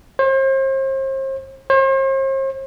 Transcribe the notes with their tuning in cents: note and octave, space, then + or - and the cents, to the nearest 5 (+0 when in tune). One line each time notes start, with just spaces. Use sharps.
C5 +40
C5 +45